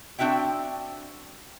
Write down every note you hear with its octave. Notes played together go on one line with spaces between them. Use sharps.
C4 D4 F#4 E5 G5